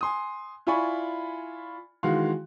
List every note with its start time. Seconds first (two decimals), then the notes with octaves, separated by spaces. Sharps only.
0.01 G#5 C6 D#6
0.67 E4 F4 D5 G#5 B5 C#6
2.03 D#3 E3 G#3 F#4 F5 C6